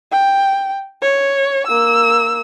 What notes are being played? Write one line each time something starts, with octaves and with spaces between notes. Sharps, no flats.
G5
C#5
A#3 E6